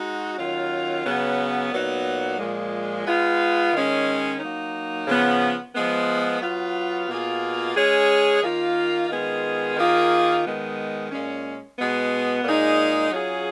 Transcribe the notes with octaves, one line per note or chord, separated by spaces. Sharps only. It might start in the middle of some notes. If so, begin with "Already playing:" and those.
Already playing: G#3 D#4 F#4
D#3 F#3 C#4 F4
C#3 F#3 B3
A#2 F#3 B3 D#4 F#4
A#2 F3 G#3
G#3 B3 F4
D#3 G#3 C#4
F#3 A#3 D#4
C#3 F3 B3
F3 G#3 B3
F#3 B3 F4
B2 A#3 F4 G#4
G#3 C#4 G#4
D#3 A#3 F4
D#3 G#3 B3 F4 G#4
D#3 A#3 F4 G#4
D#3 G#3 B3
A#2 G#3 C#4
B2 G#3 B3
A#2 G#3 D#4 G#4
F#3 C#4 F4 G#4